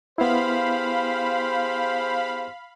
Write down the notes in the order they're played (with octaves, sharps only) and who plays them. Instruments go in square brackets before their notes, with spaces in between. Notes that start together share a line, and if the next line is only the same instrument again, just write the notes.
[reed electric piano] B3 E4 [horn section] G4 G#4 C5 [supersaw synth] F5 B5